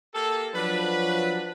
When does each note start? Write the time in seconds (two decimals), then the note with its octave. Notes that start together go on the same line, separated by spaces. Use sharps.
0.15 A#3 G4 A4
0.55 F3 F#3 D4 B4